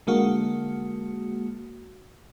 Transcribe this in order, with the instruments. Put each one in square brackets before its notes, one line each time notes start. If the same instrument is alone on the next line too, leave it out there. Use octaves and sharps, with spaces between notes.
[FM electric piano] D3 G#3 A#3 F#4